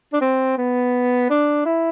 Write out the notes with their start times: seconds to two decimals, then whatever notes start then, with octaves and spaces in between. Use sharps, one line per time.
0.13 D4
0.21 C4
0.58 B3
1.30 D4
1.65 E4